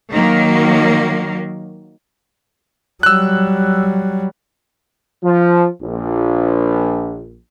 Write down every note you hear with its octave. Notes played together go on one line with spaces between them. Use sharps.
D#3 F#3 A#3
F#3 G3 E6 F#6
F3
A#1